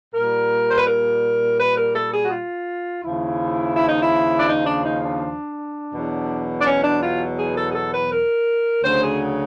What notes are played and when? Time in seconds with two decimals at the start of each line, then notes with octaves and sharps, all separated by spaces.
0.14 A#2 G3 A#4
0.70 C5
0.78 B4
0.87 A#4
1.60 B4
1.78 A#4
1.95 A4
2.13 G#4
2.24 F#4
2.31 F4
3.04 D#2 C#3 F3 E4
3.76 E4
3.89 D#4
4.02 E4
4.39 D4
4.49 D#4
4.67 D4
4.85 D#4
5.04 D4
5.94 E2 B2 F#3
6.61 D4
6.67 C#4
6.84 D4
7.03 F4
7.39 G#4
7.57 A4
7.70 G#4
7.75 A4
7.93 B4
8.11 A#4
8.83 D2 C#3 F#3 C5
9.02 G#4